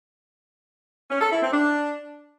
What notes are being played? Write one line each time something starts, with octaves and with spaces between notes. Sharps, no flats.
C#4
A4
E4
C4
D4